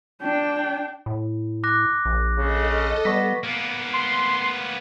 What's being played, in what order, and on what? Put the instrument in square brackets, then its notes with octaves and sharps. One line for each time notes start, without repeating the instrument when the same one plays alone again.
[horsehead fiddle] D4 G5
[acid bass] A2
[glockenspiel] D6 F#6 A#6
[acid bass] A#1
[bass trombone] C#3 [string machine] A4 D#5
[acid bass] G3 [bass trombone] B3 [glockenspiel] C#6 A#6 B6
[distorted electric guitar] A#3 B3
[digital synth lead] C6